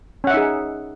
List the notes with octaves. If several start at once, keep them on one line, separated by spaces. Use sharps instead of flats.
C#4 D#4 G#4 E5 F#5